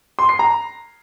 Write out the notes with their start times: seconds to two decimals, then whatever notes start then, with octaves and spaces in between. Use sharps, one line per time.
0.19 C6
0.29 C7
0.39 A#5